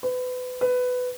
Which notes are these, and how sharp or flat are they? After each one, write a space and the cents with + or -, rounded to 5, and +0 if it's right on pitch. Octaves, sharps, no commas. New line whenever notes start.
B4 +30
B4 +15